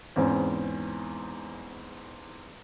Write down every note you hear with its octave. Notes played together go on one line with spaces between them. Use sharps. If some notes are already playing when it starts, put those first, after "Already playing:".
E2 G#2 C4 C#4